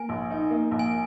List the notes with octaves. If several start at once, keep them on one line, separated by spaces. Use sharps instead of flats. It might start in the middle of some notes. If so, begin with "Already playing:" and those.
Already playing: A#3 G#5
A#1
D#4
A#3
A#1
G#5